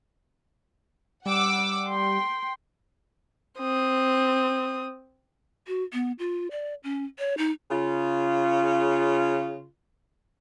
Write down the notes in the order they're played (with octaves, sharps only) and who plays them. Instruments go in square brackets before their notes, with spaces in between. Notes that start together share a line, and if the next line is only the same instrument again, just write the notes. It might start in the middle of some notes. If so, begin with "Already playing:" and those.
[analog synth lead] G3 [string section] F#5 D6 E6
[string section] G5 [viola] C6
[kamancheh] C4 D#6
[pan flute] F#4
B3
F4
D5
C#4
C#5
D#4
[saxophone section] C#3 F4